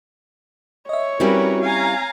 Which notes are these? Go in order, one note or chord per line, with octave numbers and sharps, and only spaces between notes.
C#5 D#5 E5
G3 C4 C#4 E4 F#4 A#4 B4
F5 G#5 A#5